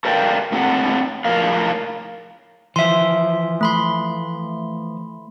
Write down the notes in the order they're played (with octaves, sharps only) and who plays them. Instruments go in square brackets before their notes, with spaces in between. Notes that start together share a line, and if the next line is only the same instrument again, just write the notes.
[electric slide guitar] A4 A#4 C5 D5 F5 G5
A2 C4 A4 F#5
A2 F3 A#4 F5
[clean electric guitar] E3 F3 [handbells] E5 C6
[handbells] A3 B5 C6